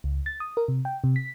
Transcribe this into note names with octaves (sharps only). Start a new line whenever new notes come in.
C#2
A6
D#6
A#4
C3
G5
C3
B6